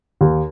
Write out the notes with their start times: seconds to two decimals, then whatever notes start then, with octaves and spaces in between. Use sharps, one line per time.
0.21 D#2